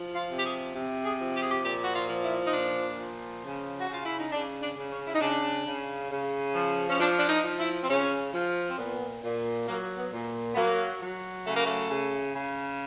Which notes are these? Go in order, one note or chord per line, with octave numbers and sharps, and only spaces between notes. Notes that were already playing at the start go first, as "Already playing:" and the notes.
Already playing: F3
F4
C3
G4
G#4
C3
G#4
F3
G4
G#4
G4
A#2 G4
F#4
F4
F3
E4
D#4
A#2 D4
F3
C#3
F#4
C#3
F4
E4
D#4
C#3 D4
D4
C#3
C#4
E4
D#4
C#3 D4
C#3
C#3
F3
C#4
F3 D4
D4
D#4
F3
E4
C4
C#3 C#4
F3
C4
A#2 B3
A#2
F#3 A#3
B3
A#2
B3
F#3 A#3
F#3
C#3 A3
A#3
A3
C#3
C#3